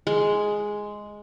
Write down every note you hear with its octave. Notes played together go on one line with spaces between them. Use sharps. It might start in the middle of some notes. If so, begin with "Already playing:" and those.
G#3